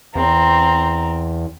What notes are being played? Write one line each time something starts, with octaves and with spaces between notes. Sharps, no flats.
E2 C4 A#5